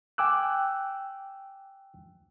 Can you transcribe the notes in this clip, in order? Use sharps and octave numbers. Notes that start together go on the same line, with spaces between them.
G5 G#5 D6 E6 F#6